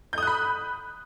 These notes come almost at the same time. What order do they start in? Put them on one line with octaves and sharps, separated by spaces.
G6 D#6 F#6 B5